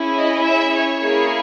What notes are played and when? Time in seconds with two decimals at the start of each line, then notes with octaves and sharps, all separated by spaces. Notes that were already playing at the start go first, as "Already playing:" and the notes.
Already playing: C#4 E4 G#4
0.17 D#5
0.45 E5
0.74 C#5
1.03 A#3 E4 G#4